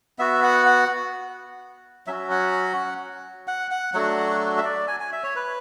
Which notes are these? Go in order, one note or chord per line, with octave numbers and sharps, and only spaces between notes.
B3 F#4 E5
F#5
F#5
F#3 C#4 F#4 E5
F#5
F#5
F#5
F#3 A3 D4 F#4 F#5
E5
D5
G#5
G#5
E5
C#5
B4